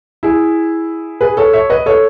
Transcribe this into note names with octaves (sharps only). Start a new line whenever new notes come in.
E4 G#4
G#4 B4
A4 C#5
C#5 E5
B4 D#5
A4 C#5